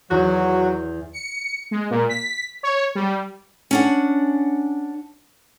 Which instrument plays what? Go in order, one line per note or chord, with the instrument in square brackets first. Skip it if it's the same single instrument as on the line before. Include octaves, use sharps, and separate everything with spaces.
[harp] E2 [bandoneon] F#3 [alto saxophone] F#4
[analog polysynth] C#7
G#3
A#2
B6
C#5
G3
[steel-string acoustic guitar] C#4 D4 F#5